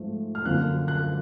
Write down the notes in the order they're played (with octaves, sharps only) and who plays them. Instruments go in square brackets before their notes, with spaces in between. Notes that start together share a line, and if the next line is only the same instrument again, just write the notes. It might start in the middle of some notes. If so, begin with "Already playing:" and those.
Already playing: [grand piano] G#2 F3 A3
F6
F#2 D3 F3 A#3 F#6
F#6